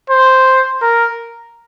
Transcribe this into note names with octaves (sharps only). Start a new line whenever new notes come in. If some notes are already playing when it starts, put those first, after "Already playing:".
C5
A#4